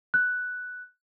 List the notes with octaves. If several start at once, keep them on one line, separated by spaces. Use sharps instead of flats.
F#6